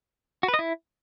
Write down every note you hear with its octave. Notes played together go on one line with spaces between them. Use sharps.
F#4
B4
D#5
E4